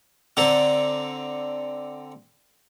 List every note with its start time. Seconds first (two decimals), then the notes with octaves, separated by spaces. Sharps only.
0.37 D3 C4 A4 A#5